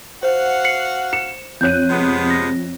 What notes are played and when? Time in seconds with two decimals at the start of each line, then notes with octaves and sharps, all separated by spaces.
0.23 F#4 C5 F5 F#5
0.64 C7 C#7 F#7
1.13 C#7 E7
1.61 F2 C#5 F#6 G6 D#7
1.90 C3 G#3 B3
2.30 A#6